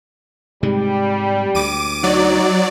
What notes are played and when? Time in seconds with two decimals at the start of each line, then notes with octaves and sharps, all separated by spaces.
0.63 G#2 C3 G3 G#3
1.55 D2 D6 D#7
2.03 F#3 D#4 D5